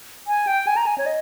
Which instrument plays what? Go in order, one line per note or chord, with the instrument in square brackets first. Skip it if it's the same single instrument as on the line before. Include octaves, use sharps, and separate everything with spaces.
[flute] G#5
G5
G#5
A#5
G#5
C#5
D#5